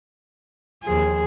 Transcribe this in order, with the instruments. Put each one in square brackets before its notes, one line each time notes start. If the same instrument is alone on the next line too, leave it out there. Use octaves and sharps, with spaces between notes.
[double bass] D#2 F3 [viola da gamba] G#4